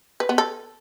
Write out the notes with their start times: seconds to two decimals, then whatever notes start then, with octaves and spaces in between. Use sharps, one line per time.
0.20 B4
0.29 B3
0.38 A4